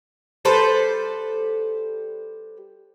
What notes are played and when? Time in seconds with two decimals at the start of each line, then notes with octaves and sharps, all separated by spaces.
0.45 G3 A4 B4 C5